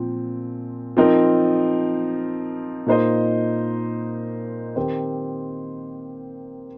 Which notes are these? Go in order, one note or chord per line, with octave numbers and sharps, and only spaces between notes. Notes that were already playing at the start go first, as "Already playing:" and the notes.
Already playing: A#2 F3 C4
F3 C4 D#4 A#4
A#2 A#3 D#4 C5 D#5
D#3 C4 G4 C5